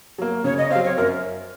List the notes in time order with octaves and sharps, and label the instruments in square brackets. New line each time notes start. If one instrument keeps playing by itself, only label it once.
[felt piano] F#3 A#3
[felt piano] C#3 [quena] C#5
[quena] D#5
[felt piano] C4 [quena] F5
[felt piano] F#3
[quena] C#5
[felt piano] F#2 [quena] A#4